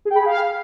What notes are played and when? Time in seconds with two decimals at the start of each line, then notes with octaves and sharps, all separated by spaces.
0.05 G#4
0.10 G5
0.16 B5
0.21 G#4
0.26 F5